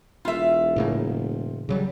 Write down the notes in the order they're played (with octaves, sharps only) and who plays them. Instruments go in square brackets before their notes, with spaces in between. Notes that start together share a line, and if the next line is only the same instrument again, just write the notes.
[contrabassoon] E1 [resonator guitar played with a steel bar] F4 E5
[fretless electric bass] A2 C#3 A#3
C#3 F#3 G3